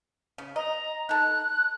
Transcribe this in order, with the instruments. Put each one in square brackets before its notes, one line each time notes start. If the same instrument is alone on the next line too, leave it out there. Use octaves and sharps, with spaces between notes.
[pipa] C#3
[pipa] D#5 [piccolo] A#5
[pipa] D#4 A4 [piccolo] F#6